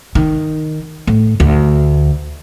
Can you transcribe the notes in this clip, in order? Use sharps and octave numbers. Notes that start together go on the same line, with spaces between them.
D#3
A2
D2